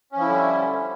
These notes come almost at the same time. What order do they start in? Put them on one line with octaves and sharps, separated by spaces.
C#4 F3 E4 D3 G3